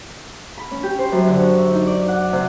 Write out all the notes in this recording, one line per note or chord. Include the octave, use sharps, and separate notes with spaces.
B5
C#4
G4
C5
F#2
D3
C#6
E5
D#4
D5
F#5
C3